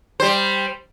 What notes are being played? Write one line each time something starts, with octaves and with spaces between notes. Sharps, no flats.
G3 C5